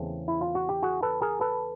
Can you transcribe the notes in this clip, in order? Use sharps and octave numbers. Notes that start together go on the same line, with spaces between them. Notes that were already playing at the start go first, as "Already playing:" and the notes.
Already playing: E2 C#3 E3 A3 C4
E4
F4
F#4
G4
F#4 G#4
A4 B4
G#4 A#4
A4 B4